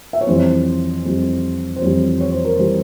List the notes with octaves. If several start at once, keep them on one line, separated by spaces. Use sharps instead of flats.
E5
C#5
F2 E3 G3 C5
F2 E3 G3
C5
F2 E3 G3 C#5
C#5
C5
A#4
E3 G3 C5